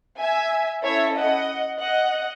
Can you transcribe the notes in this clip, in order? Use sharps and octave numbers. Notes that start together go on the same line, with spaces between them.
E5 G#5
C#4 E4 A4 C#5 E5
D#5 F#5
D#5 F#5